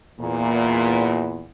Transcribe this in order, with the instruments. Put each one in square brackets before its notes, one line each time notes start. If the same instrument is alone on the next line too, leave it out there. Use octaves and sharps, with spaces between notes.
[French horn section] E2 A#2